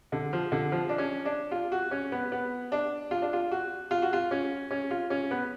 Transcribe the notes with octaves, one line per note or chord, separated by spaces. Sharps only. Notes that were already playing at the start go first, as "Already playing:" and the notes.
D3
F3
D3
F3
D4
C#4
D4
F4
F#4
C#4
B3
B3
D4
F4
D4
F4
F#4
F4
F#4
F4
C#4
C#4
F4
C#4
B3